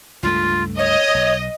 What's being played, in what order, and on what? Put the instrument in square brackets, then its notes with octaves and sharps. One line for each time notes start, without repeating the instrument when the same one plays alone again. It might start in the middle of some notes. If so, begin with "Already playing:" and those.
[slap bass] C#2 G2 A3 [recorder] F4
[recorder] C#5 [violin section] D#5
[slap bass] B1